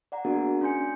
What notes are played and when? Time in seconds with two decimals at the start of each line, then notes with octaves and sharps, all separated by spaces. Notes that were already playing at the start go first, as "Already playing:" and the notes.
0.12 D5 F#5 A#5
0.25 A#3 B3 D4 F#4 G#4 A#4
0.61 C#4 G#5 C6 G6 C#7